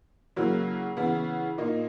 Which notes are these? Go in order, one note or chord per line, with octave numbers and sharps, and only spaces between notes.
C#3 F#3 A#3 E4
C#3 E3 B3 E4
A#2 A#3 D#4